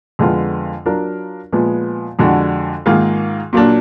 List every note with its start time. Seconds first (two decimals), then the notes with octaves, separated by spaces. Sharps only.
0.19 F2 D3 G#3 B3 F4
0.86 F#3 D4 F4 A#4
1.53 A#2 F3 G#3 B3
2.19 F2 D3 G#3 D4 F#4
2.86 G#2 D#3 A#3 F4 G#4
3.53 A#2 F#3 A#3 D4